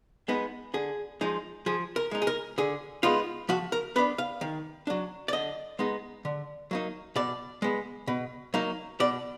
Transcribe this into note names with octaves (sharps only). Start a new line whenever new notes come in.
G#3 B3 D#4
D3 G#4
F3 G#3 D#4
F3 G#4
A#4
G#3 D#4
G#4
A#4
D3 G#4
G#3 B3 D#4 F4
F3 F#4
A#4
B3 D4 B4
F5
D#3
F#3 D4
D5
D3 D#5
G#3 B3 D#4
D3
F#3 A#3 D#4
B2 D5
G#3 B3
B2
F#3 A#3 D#4
B2 D5